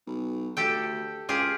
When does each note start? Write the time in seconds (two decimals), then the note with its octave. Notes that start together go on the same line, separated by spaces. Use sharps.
0.07 B1
0.57 D2 G4 A4 G5
1.29 C#2 F4 G4 G#4